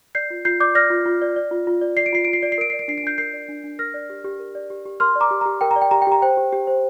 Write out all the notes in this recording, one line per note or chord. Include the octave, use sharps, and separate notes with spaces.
D5 G6 C7
F4
F4 G6 C7
D5 D6 G6
D5 F6 A#6
F4
F4
D5
D5
F4
F4
D5
D5 C7
D7
F4 C7
F4 D7
C7
D5 D7
C7
A#4 D7
D5 C7
D7
D4 C7
D7
D4 G6 C7
A#4 G6 C7
D5
D4
D4
A#4 F6 A#6
D5
G4
G4
A#4
D5
G4
G4
A#4 C6 F6
D5
A#5 D6
G4
G4 A#5
A#4 G5
A#5
D5
G5
G4 A#5
G5
G4 A#5
C5 G5
G4
G4
C5